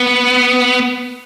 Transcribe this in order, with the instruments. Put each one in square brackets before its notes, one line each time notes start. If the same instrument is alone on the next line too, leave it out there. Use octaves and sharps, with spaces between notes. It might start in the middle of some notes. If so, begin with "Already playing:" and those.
Already playing: [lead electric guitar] B3